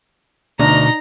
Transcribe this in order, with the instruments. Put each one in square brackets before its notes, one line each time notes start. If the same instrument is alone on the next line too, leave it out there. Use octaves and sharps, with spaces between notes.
[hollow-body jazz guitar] D2 [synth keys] B2 D4 [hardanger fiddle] D#4 A#5